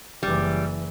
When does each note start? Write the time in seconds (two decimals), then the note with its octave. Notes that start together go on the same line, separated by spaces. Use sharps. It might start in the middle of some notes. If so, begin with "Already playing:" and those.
0.23 F#1 E3 G3